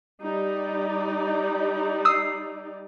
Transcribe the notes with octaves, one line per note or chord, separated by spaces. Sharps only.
G3 D#4 D5
D#6 E6 C7